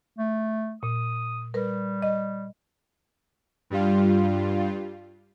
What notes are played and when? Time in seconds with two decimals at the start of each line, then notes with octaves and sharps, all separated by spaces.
0.18 A3
0.83 A#2 D#6
1.54 G3 A#4 B4
2.02 D#5
3.70 G2 G3 F4